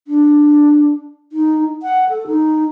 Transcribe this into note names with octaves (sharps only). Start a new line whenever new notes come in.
D4
D#4
F#5
A4
D#4